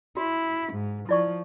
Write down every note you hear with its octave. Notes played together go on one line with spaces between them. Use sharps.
E4 F#4
G#2
F3 E4 D5 C#6